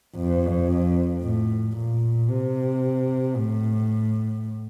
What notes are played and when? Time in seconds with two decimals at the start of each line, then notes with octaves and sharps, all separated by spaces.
0.16 F2
1.23 A2
1.77 A#2
2.30 C3
3.37 A2